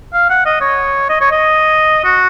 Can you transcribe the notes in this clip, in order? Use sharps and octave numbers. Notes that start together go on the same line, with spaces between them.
F5
F#5
D#5
C#5
D#5
C#5
D#5
F#4